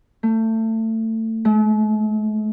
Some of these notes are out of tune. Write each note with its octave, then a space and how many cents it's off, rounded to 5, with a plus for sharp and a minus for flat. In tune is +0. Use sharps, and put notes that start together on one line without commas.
A3 +25
A3 -45